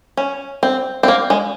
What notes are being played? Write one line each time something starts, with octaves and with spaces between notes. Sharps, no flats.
C#4
C4
C4
A#3
G#3